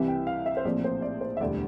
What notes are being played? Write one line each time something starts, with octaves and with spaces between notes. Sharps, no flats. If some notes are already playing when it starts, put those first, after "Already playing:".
Already playing: C2 C3 E3 G3 E5
G5
F5
E5
C5
A#1 A2 F3 C4 D5
C5
D5
C5
E5
E1 D2 D3 G3 D5